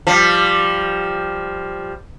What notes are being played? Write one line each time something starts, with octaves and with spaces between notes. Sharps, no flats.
F3 G3